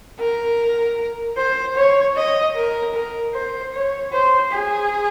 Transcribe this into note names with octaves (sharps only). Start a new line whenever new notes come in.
A#4
C5
C#5
D#5
A#4
A#4
C5
C#5
C5
G#4